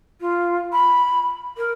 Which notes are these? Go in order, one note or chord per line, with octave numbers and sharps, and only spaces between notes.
F4
B5
A#4